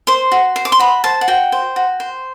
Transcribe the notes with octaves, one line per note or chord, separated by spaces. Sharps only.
C5 C6
F#4
C5
D6
C6
F#4 B5
C5 A5
F#5
F#4 G5
C5
F#4
C5